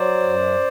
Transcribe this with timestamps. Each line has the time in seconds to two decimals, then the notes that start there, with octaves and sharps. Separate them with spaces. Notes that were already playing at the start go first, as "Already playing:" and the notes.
Already playing: F#3 C5 D5
0.22 F#2